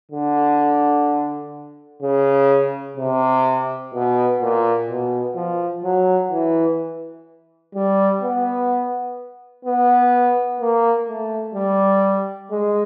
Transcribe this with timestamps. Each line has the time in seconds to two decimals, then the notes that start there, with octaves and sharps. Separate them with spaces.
0.12 D3
2.03 C#3
2.98 C3
3.94 B2
4.41 A#2
4.89 B2
5.36 F3
5.84 F#3
6.32 E3
7.75 G3
8.22 B3
9.65 B3
10.60 A#3
11.09 A3
11.55 G3
12.51 G#3